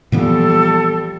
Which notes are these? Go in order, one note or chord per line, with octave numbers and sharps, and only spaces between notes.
A#2 E3 F3 G3 B3 A4